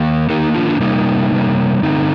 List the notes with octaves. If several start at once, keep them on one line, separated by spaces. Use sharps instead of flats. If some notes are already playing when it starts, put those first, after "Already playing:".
Already playing: D#3 A#3
D#3 A#3 D#4 G4
D4 F4
D4
C3 G3 A#3 D#4
C3 G3 A#3
D3 A3 C4 D#4